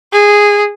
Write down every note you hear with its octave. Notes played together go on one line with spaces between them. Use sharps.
G#4